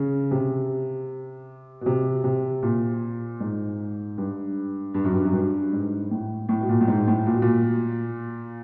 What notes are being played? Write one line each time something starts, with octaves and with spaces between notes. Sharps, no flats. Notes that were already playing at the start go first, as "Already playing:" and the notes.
Already playing: C#3
C3
B2
C3
C3
A#2
G#2
G2
G2
F#2
G2
F#2
G2
G#2
A2
A2
B2
A#2
A2
G#2
A2
A#2
B2
A#2